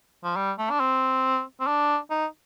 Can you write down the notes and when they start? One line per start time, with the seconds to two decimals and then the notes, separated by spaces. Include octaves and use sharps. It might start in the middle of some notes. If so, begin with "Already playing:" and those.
0.24 F3
0.36 G3
0.58 A3
0.71 D4
0.80 C4
1.60 C4
1.67 D4
2.10 D#4